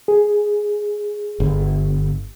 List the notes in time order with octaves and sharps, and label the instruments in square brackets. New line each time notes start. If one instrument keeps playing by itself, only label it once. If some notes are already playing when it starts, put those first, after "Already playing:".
[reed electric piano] G#4
[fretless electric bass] G1